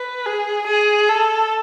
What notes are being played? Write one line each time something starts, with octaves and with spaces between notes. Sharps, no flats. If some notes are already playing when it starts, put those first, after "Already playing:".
Already playing: B4
G#4
G#4
A4